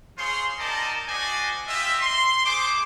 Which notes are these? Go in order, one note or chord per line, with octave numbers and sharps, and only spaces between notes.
F4 G#4 C5 C#5 C6
C4 D#4 A#4 D5 D#5 A5
D4 F#4 C5 D5 D#5 G#5
F4 G4 D#5 E5
C6
A3 G#4 C5 C6 D6